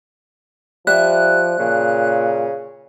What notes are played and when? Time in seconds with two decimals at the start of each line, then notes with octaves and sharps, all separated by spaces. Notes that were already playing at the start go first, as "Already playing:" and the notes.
0.87 F3 G3 E5 F#6
1.59 A#2 C#3